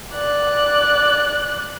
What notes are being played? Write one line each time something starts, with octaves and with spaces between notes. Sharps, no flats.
D5 F#6